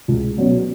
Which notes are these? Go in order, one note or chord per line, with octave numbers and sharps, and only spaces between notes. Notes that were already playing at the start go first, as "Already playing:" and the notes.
C#2
B2 F#3 C#4